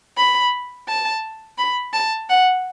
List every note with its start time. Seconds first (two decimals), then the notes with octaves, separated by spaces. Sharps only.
0.18 B5
0.89 A5
1.58 B5
1.94 A5
2.30 F#5